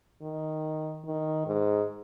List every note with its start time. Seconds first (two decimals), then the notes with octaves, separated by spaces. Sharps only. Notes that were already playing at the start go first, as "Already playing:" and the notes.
0.22 D#3
1.05 D#3
1.46 G#2